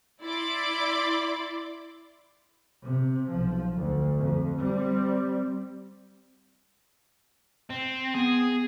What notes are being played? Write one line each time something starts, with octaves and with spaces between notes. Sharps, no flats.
E4 D5 B5 C6 D6
C3
B1 F3
D2
F2
G3 C4
C4
B3 G#4